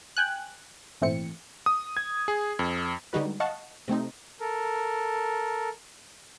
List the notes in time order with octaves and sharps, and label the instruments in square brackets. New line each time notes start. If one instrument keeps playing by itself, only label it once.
[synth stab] G5 G#5 F#6
G#1 A#2 E3 A3 C4 C#7
[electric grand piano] D#6
G#6
G#4
F2
[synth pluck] D3 G3 G#3 D#4 F#4 B4
D#5 F5 F#5 A5 C#6
C3 A3 C4 D#4
[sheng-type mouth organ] A4 A#4